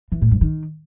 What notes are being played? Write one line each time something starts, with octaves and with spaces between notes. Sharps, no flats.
E3
A2
G2
D#3